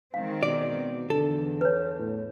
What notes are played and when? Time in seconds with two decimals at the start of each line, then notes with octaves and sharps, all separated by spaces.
0.14 D#3 G#3 C4 F5
0.43 B2 D5
1.10 E2 D3 A4
1.61 B4 C#5
1.99 A2